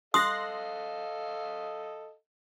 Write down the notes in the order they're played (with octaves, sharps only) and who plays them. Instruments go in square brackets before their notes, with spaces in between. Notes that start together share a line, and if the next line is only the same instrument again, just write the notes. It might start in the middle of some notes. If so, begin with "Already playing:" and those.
[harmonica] A4 D#5 F5 [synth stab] C6 F#6 A#6 [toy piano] D#6